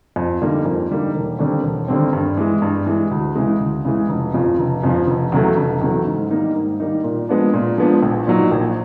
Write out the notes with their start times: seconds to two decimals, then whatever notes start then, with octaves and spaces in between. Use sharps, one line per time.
0.16 F2
0.41 D3 G3 A#3 D#4
0.65 F2
0.90 D3 G3 A#3 D#4
1.15 E1
1.39 D#2 D3 G3 C4
1.64 E1
1.88 D#2 D3 G3 C4
2.13 G2
2.37 E3 G#3
2.62 G2
2.86 E3 G#3
3.11 D2
3.35 C#3 E3 G#3
3.60 D2
3.85 C#3 E3 G#3
4.09 F1
4.34 F2 C#3 F3
4.59 F1
4.83 F2 C#3 F3
5.07 F1
5.32 E2 C#3 F#3 A3
5.57 F1
5.82 E2 C#3 F#3 A3
6.06 G#2
6.31 D#3 G3 A#3 D#4
6.55 G#2
6.80 D#3 G3 A#3 D#4
7.04 A#2
7.29 F3 G#3 B3 D4
7.54 A#2
7.78 F3 G#3 B3 D4
8.02 A#1
8.27 A#2 F#3 A#3 D#4
8.52 A#1